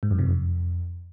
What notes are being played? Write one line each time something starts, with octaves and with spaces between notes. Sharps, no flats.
G#2
F#2
C3
F2